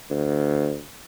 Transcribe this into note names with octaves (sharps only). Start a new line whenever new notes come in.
D2